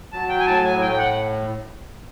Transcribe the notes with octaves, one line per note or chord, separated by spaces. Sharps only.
F#3 A5
G5
G#5
A2 A5
G#5
A2 G5
G5
F#5